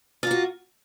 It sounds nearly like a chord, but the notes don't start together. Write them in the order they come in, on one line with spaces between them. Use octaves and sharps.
F4 A#3 F#4